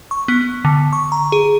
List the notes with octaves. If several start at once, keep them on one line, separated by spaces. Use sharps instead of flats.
C#6
B3
D3
C#6
A#5
G#4